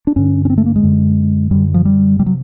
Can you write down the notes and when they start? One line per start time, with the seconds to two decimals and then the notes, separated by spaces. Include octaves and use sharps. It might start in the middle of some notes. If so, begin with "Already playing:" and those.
0.07 D4
0.16 G2 D3 C#4
0.45 C#4
0.50 C4
0.58 A3
0.66 A#3
0.76 G#3
0.83 F#2 D3
1.51 F#2 D3 G3
1.74 F3
1.85 G3
2.19 C3 G3
2.26 F#3